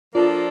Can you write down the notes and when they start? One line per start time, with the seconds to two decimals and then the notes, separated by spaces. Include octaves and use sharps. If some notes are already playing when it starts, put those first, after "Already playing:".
0.15 F3 A#3 D4 F4 A4 D5